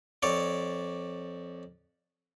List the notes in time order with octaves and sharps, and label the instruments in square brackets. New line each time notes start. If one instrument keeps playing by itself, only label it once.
[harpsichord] F2 C#5 D5